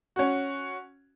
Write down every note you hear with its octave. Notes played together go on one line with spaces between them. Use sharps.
C#4 F#4